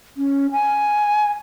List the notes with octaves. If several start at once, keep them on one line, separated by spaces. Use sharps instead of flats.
C#4
G#5